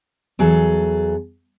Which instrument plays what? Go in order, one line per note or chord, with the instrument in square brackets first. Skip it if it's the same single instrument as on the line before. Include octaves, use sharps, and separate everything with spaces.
[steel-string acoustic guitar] E2 F#3 G#4 A4